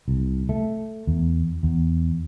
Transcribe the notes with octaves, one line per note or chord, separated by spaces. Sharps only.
C2
A3
E2
E2